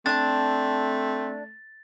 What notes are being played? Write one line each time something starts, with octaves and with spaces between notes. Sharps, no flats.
A3 C4 D4 A5 A6